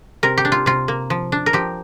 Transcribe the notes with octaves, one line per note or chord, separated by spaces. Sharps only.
C3 A#4
G4
D4
F4
C3 F4
A#3
F3
D4
A#4
F3 G4